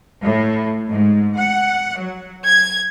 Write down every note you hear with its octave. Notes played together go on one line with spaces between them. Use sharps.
A2
G#2
F#5
F#3
G#6